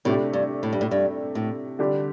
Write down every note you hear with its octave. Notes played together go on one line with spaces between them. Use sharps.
A2 C3 A3 D4 G4
G2
A2
G2
A2
G2
A2
D3 G3 D4 G4